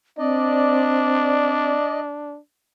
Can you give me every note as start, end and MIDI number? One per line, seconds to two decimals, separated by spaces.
0.19 1.77 60
0.19 2.38 62
0.19 2.00 74
0.19 2.00 75